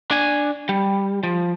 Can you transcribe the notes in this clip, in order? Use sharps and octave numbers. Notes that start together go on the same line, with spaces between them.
D4 G#5
G3
F3